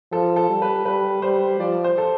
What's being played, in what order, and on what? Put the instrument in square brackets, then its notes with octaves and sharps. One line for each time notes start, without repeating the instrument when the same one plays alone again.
[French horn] F3 [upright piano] A4
[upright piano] A4
[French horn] G3
[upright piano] B4
[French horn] G3 [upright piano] B4
[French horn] G3 [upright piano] C5
[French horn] F3 [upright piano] D5
[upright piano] C5
A4